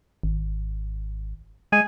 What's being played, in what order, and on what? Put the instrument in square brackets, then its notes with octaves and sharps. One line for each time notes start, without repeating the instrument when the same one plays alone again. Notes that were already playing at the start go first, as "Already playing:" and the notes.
[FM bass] G#1
[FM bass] G#3 [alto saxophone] G#5